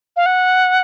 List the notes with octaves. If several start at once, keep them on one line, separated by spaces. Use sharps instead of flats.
F5
F#5